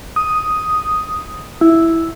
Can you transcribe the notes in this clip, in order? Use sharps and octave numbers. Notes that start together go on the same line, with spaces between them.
D#6
E4